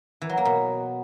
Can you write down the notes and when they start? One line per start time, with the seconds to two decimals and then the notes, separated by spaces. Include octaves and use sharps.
0.22 E3
0.29 F#3
0.37 A#3
0.45 B2